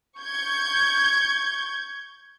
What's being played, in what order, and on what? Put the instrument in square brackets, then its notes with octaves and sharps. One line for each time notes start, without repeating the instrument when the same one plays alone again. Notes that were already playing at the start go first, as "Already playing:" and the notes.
[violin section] C#6 G6 G#6